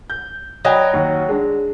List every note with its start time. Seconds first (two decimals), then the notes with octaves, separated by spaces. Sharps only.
0.10 G6
0.65 F#3 D#5 G5 B5
0.93 D#2
1.29 G#3 D4